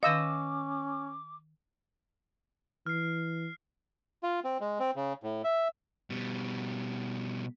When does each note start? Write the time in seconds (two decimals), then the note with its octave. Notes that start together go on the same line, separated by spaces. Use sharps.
0.03 D#3 C#4 D#5 F5 D6 E6
2.86 E3 F6 C7
4.23 F4
4.44 C4
4.61 G#3
4.80 C4
4.96 C#3
5.23 A2
5.44 E5
6.10 B2 G3